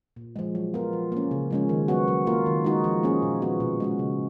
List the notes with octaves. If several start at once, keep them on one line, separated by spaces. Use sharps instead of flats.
A#2
F3 G#3
F#3
B3 F4 A#4
F3
A#3 C#4
C#3
F3 G#3 C#4
D#3
F#3 B3 F#4
F#3
A#3 F4 A#4
D#3
G#3 D#4 F#4
F3
A#3 C#4 G#4
A#2
F3 B3 F#4
B2
G#3 C#4 F#4
C#3